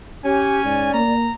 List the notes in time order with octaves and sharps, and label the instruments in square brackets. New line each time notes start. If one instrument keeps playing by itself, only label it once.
[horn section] C#4 [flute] G4 [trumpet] G#5
[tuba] G#2 [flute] D5
[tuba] A#3 [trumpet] A#5